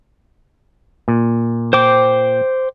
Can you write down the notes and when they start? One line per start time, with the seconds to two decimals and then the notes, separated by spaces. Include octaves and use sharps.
1.08 A#2
1.73 C5 G5 D6